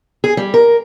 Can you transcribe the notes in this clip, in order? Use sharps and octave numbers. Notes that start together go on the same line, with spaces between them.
G#4
G3
A#4